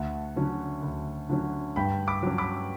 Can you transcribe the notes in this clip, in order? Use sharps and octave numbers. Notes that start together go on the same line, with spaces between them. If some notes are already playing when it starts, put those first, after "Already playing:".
Already playing: D2 F#5 A5
D3 F#3 C#4
D2
D3 F#3 C#4
G2 G5 B5
B5 D6
F#3 C#4
B5 D6